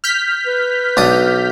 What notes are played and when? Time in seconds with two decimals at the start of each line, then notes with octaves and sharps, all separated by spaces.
0.04 F6 G6 B6
0.47 B4
0.97 B1 D4 D#6